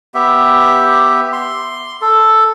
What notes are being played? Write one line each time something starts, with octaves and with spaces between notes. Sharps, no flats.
B3 G4 E5
C6
A4